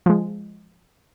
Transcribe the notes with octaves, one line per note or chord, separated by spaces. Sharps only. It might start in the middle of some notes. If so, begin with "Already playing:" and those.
F3 G#3